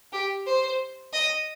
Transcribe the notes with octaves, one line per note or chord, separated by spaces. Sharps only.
G4
C5
D#5